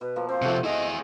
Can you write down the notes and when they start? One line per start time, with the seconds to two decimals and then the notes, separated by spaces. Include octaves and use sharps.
0.01 B2 B4
0.16 F3 A#3
0.29 C4 C5
0.42 C3 F3 A3 F#5
0.64 E4 G#4 D#5